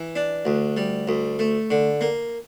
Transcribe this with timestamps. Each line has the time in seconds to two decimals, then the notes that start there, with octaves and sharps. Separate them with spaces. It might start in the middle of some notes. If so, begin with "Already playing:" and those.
Already playing: E3
0.16 D4
0.45 D2
0.77 G3
1.08 D2
1.39 A3
1.71 D3
2.01 A#3